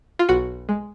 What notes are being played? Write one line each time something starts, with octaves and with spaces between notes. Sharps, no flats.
F4
B1 F#4
G#3